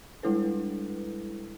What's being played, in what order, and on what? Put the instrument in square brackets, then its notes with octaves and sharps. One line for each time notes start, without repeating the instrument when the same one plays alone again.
[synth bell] G3 G#3 D4 E4 A4 B4